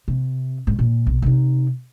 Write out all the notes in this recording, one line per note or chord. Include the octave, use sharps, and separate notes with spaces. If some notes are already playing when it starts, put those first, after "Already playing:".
C3
G#2 C#3
A#2
B1
C3 D#4